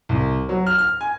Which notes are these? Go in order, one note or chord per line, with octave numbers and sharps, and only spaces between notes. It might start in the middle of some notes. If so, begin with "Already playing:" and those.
C2
F#3
F6
F6
G#5